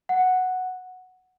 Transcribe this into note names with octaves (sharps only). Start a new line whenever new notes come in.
F#5